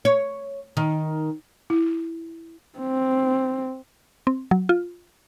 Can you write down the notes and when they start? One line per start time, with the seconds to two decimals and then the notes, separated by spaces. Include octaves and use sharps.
0.05 C#5
0.77 D#3
1.70 E4
2.79 C4
4.27 C4
4.51 F#3
4.69 F4